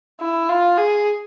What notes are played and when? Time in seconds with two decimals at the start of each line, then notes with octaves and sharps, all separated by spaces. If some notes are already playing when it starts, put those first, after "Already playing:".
0.21 E4
0.49 F4
0.77 G#4